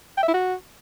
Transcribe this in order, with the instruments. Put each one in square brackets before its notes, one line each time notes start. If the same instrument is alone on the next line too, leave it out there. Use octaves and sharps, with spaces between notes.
[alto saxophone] G5
E5
E4
F#4